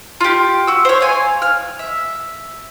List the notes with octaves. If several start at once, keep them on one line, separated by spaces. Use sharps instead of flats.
F4 G4
F#4 E6
C5 C#5
F5 G#5
F6
E5